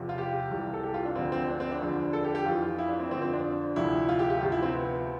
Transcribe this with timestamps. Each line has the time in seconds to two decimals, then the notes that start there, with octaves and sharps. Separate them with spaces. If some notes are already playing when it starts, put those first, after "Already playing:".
Already playing: E2 C3 F3
0.09 F4
0.18 G4
0.51 C2 C3 E3
0.74 A4
0.84 G4
0.94 F4
1.05 D4
1.15 D2 D3 F3 C4
1.32 C4
1.48 D4
1.60 C4
1.71 D4
1.81 E2 D3 F3
2.13 A4
2.24 G4
2.35 G4
2.45 F2 E3 F4
2.62 F4
2.79 E4
2.89 D4
3.00 C4
3.11 F2 D3 F3 C4
3.22 C4
3.33 D4
3.76 D2 C3 F3 E4
4.09 F4
4.19 G4
4.30 G4
4.41 D2 C3 F3 F4
4.52 E4
4.63 C4
4.74 B3